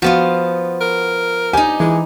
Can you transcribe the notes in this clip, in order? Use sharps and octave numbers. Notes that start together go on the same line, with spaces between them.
F3 B3 F4 F#4
A#4
D#4 G4 G#5
E3 G#3